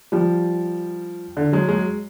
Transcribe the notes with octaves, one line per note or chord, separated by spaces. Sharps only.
F3 G3
D3
F#3 G#3
F#3 G#3